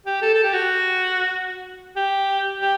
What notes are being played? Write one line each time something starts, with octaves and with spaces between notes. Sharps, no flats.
G4
A4
A4
G4
F#4
G4
G4